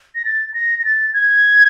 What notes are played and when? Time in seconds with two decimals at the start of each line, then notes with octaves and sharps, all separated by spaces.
0.15 A#6
0.25 A6
0.54 A#6
0.80 A#6
0.85 A6
1.14 G#6